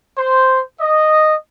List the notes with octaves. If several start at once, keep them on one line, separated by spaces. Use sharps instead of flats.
C5
D#5